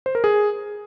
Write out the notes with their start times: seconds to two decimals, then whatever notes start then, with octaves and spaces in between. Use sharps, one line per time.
0.06 C5
0.15 A#4
0.24 G#4